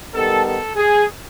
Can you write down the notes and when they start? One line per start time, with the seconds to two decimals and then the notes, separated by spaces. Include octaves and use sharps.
0.14 D#3 G3 B3 A4
0.45 A4
0.76 G#4